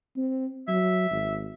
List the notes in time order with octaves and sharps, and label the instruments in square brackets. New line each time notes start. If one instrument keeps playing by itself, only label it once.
[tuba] C4
[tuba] F#3 [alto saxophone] E5
[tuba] G#1